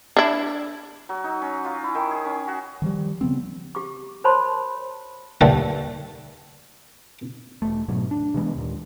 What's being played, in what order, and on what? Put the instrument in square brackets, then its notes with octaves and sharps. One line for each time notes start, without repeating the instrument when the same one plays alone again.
[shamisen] D4 E4
[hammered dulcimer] F#3
D#4
C#4
F4
E4
D#3
G#4
C#4
F#4
[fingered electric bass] D#3 F3 G3
C#3 F3 B3 C4
[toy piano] G4 D6
A#4 C5 C#5 A5 B5 C6
[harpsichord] D#2 D3 G3 A3 B4 C#5
[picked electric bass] E1 A3
D2 G#2 B2 F#3
D4
C3 E3 G#3 B3
D#2 A#2